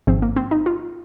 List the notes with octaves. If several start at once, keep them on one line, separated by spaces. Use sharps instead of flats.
G#1 G#2 F3 C4
A#3
C4
D#4
F4